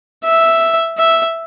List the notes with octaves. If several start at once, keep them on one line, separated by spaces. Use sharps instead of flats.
E5
E5